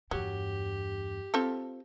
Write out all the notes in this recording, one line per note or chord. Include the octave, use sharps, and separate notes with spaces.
E2 G2 F#3 G4
C4 F4 A4